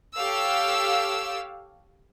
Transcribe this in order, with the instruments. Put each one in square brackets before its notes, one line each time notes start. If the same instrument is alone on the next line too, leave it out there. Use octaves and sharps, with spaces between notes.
[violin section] G4 A4 C#5 F5 E6